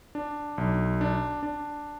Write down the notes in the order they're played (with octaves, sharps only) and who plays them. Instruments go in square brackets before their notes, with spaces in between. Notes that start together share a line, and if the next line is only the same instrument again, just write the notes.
[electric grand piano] D4
B1
D4
D4